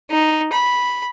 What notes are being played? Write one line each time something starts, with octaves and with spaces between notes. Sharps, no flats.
D#4
B5